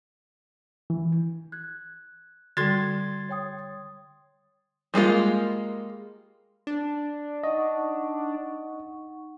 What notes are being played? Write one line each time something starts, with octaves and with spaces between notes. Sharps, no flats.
E3
F#6 G#6
D3 G3 F#4 A4 C6 G#6 A6
C#5 G5 D#6
G3 G#3 A#3 F4
D4
D#4 D#5 F#5 C#6